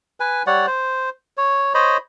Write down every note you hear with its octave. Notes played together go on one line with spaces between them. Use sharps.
B4 G#5
G3 C#5 D5 F#5
C5
C#5
C5 C#5 D#5 B5